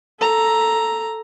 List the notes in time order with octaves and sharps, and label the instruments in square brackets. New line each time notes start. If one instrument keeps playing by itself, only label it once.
[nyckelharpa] A4 A#5